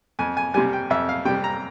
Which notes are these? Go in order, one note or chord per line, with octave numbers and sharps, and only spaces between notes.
F2 G#5
G#5
C3 G3 G#5
G5
F2 E5
F5
C3 G3 G5
A#5